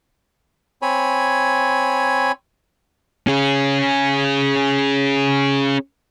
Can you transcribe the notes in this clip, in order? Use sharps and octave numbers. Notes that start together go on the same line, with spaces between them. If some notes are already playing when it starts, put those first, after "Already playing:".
C4 C#5 G#5 B5
C#4 G#4